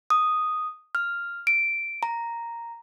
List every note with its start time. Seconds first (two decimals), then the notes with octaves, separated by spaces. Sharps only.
0.10 D#6
0.95 F6
1.47 D7
2.03 A#5